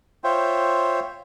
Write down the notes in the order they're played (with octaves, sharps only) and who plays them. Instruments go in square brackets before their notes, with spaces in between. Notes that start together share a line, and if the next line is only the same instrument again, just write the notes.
[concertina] F4 C5 C#5 E5 G5